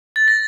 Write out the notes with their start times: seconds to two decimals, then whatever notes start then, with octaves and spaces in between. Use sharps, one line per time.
0.16 A6
0.28 A#6